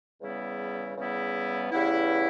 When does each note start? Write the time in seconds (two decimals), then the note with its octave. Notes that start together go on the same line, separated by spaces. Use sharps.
0.21 E2 C#3 G3 B3 E4
0.97 E2 C#3 G3 B3 E4
1.71 E2 C#3 G3 B3 E4